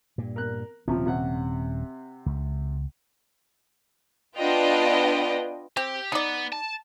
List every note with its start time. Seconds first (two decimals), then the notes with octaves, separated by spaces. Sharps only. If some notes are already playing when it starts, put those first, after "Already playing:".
0.18 G2 A#2
0.36 A#4 F#6
0.88 D#1 C3 F3 C#4
1.06 C3 F#5
2.26 C#2
4.37 B3 D4 F4 B4 D#5 G5
5.77 C4 G4
6.12 B3 D#4 D5
6.53 A5